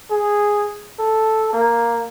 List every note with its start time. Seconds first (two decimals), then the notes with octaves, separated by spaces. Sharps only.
0.10 G#4
0.99 A4
1.53 A#3